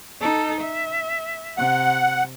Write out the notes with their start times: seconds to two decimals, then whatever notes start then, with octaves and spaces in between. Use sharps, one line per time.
0.21 D#4 A4
0.61 E5
1.57 C3 F#5